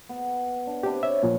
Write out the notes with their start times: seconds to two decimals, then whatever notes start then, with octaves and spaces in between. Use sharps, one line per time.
0.09 B3
0.67 D4
0.83 C3 D4 G4 B4
1.03 C#5 E5
1.23 A#2 F3 A#3